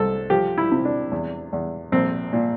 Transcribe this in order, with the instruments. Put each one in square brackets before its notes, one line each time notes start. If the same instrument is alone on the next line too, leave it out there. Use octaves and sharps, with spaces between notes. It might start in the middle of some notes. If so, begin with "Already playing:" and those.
Already playing: [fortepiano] C2 A4
F3 G4
E4
C3
D4
E2
E2
A#1 C4
A#2